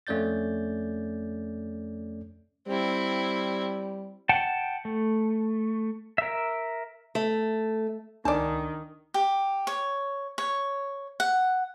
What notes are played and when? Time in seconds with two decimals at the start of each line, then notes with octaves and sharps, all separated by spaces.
0.07 F2 A3 C#4 D5 G6 A6
2.68 G3 C4 E4
4.29 F#5 G5 A5
4.85 A3
6.18 A#4 E5
7.15 A3
8.25 C#2 D#3 D4 D5 A5 D6
9.14 G4
9.67 C#5
10.38 C#5
11.20 F#5